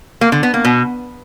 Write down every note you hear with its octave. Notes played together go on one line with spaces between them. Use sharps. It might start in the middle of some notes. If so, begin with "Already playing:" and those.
A#3
D3
B3
A#3
B2